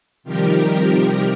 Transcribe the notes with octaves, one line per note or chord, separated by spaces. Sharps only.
C3 D#3 F3 G3 G4 A#4